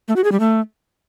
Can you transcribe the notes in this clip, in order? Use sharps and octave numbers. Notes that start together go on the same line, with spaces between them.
A3
F#4
G#4
G3
A3